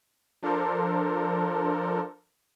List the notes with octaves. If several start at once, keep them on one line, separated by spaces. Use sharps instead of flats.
F3 D4 A4 A#4 C5